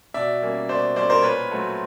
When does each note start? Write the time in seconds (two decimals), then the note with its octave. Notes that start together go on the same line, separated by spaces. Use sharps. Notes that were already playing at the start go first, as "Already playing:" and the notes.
0.14 B2 D5 E5
0.42 G3 A#3 C#4
0.69 B2 C5 D5
0.96 G3 A#3 C#4 C5 D5
1.10 A#4 C5
1.22 A#2 B4 C#5
1.51 F#3 A3 C4